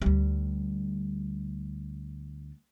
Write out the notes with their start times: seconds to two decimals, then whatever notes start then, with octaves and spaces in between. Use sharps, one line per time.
0.02 D2 G3